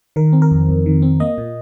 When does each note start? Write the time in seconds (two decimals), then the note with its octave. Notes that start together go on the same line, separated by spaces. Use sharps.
0.16 D#3 A#4
0.33 C4
0.42 A#4
0.51 F2
0.69 F2
0.86 D#3
1.02 C4
1.20 A#3 D#5
1.38 A#2